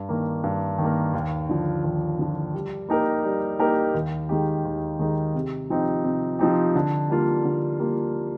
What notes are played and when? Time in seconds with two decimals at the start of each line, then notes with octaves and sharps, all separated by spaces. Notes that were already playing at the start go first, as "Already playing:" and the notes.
Already playing: G2
0.09 D#3 A#3
0.44 G2
0.78 D#3
0.84 A#3
1.14 D#2
1.49 D3 F3
1.84 D#2
2.19 D3 F3
2.54 G3
2.89 A#3 D#4 G4 A#4
3.25 G3
3.59 A#3 D#4 G4 A#4
3.94 D#2
4.29 D#3 G#3 D#4 G4
4.65 D#2
4.99 D#3 G#3 D#4 G4
5.35 C3
5.70 F3 C4 D#4 G4
6.04 C3
6.39 F3 C4 D#4 G4
6.75 D3
7.10 G3 A#3 F4
7.45 D3
7.79 G3 A#3 F4